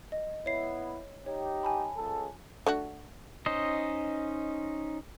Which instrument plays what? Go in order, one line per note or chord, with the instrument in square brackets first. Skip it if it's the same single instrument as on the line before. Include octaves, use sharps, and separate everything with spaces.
[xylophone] D#5
[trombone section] B3 E4 [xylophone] C#5 C7
[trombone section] D#4 G4 [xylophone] C#5
[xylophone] G#5 A5 B5
[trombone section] C#2 G#4 A4
[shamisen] A3 D4 F#4
[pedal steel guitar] C#4 D#4 C5 D#5